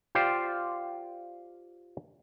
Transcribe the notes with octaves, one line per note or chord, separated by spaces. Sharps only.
F4 G4 C5 D5 F5 G5